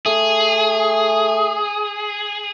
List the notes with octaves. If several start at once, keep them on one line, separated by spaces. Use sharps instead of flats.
A3 G#4